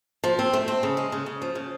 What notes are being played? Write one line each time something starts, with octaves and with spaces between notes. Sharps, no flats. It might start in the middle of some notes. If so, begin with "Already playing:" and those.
F3
C4
A3
C4
C#3
G#3
C#3
C#3
F3
C#3